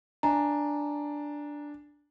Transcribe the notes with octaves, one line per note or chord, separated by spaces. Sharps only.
D4 G#5 A#5